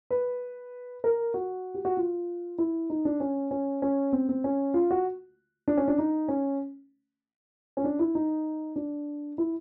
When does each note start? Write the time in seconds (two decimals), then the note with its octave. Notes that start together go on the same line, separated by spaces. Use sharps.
0.10 B4
1.04 A#4
1.34 F#4
1.74 G4
1.85 F#4
1.97 F4
2.58 E4
2.90 D#4
3.05 D4
3.20 C#4
3.51 C#4
3.82 C#4
4.13 C4
4.29 C4
4.44 C#4
4.74 F4
4.91 F#4
5.68 D4
5.77 C#4
5.88 D4
5.98 D#4
6.28 C#4
7.77 C#4
7.84 D4
7.99 E4
8.15 D#4
8.76 D4
9.38 E4